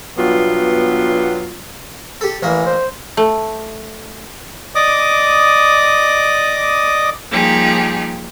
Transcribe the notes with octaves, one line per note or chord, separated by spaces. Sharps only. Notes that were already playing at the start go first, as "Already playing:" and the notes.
G2 B2 F#3 G3 B3 F4
G4 A4
A1 E3 A#3
C5
A3
D5 D#5 D6 D#6
F3 G3 A#3 D#4 G4 G#4